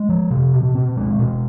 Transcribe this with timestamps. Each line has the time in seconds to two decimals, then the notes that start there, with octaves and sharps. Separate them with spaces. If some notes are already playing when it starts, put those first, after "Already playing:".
Already playing: G#3
0.09 F3
0.31 C3
0.53 B2
0.75 C4
0.97 G#3
1.19 B2